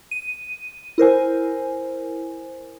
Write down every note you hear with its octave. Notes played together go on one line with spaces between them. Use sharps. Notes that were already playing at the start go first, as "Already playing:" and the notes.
D#7
E4 A#4 C5 G#5